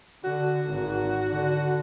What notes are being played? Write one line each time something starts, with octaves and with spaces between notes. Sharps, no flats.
D3 F#4
G#1
D3